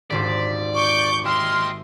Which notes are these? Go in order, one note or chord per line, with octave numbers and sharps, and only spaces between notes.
D#1 G#1 C5 D5 B6
C#6 D6 G6
G4 D#5 E5 C6 F6